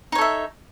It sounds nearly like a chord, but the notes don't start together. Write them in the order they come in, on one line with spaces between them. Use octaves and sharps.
D#4 C#5 A4 E5